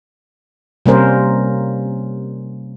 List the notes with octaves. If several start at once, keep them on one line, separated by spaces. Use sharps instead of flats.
C3 G3 A#3 C#4 A#4 C5